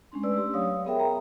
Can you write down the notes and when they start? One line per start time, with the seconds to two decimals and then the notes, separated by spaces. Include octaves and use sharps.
0.12 G#3 C#4 D4 C6
0.23 A3 B4 D5 E6
0.37 G4 C6
0.54 F#3 C#5 F5 D#6
0.86 B3 G#4 A#4 E5 G5
1.00 A#5